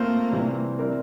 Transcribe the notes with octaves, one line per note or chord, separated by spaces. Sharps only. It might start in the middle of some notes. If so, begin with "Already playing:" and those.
Already playing: A3 A#3 C4 F4 C5
C3 E3 G3 C4
G3 C4 E4 A#4 D5